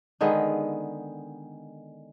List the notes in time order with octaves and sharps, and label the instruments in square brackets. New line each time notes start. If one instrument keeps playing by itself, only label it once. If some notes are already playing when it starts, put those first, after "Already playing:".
[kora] D3 D#3 G#3 B3